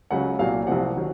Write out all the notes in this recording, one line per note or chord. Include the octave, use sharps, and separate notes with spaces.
C#2 C#3 F#3 F#5
C2 A#2 F#3 F5
C2 C3 F3 F#5
D#3 F#3